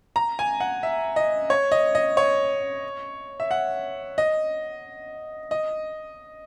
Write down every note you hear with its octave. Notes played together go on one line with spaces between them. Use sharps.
A#5
G#5
F#5
E5
D#5
C#5
D#5
D#5
C#5
E5
F#5
D#5
D#5